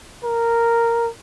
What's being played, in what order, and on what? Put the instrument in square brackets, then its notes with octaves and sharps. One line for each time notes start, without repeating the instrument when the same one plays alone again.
[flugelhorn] A#4